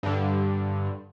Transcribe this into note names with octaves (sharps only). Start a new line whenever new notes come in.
G2 D3